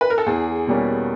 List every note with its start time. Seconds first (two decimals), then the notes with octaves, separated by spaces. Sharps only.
0.01 B4
0.10 A#4
0.18 A4
0.26 E2 G#4
0.67 B2 G3 A#3 C#4